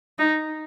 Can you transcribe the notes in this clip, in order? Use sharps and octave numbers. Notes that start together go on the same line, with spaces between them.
D#4